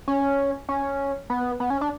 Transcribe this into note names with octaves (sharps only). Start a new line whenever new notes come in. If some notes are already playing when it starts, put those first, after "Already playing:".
C#4
C#4
B3
B3
C#4
D4